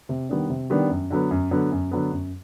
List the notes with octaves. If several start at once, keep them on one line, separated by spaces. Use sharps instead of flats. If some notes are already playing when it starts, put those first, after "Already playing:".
C3
D#3 G3 B3 D4
C3
D#3 G3 B3 D4
F#2
D3 F#3 B3
F#2
D3 F#3 B3
F#2
D3 F#3 B3
F#2